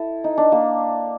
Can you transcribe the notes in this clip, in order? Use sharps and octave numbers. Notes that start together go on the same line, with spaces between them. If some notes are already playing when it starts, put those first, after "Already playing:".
Already playing: E4 A4
D#4
D4
A#3